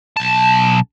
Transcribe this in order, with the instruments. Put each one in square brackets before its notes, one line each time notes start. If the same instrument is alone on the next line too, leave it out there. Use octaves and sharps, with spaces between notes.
[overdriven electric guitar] B1 A5